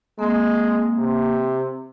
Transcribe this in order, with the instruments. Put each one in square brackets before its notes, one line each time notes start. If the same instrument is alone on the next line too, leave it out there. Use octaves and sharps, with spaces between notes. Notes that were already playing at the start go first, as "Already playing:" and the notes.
[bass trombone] G#3 [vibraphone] A#3 C4
[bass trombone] C3